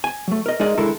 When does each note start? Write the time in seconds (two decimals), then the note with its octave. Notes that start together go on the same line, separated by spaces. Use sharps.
0.04 G#5
0.28 F#3 A3
0.46 A#4 D#5
0.60 G#3 D#4 A#4 D5 D#5 G#5
0.78 D#2 D3 G#3 E4 A4 A#4